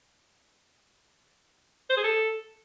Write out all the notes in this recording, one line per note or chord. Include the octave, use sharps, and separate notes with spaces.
C5
G#4
A4